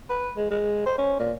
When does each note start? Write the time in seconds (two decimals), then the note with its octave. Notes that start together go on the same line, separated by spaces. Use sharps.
0.09 B4
0.36 G#3
0.50 G#3
0.86 C5
0.98 C#4
1.19 A#2